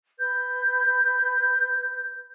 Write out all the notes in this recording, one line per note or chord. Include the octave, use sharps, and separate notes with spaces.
B4 G6